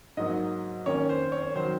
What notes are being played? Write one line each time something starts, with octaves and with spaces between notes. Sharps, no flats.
G#2 F#3 A#3 D#4 D#5
D#3 A#3 C#4 C#5
C5
C#5
D#3 F#3 C5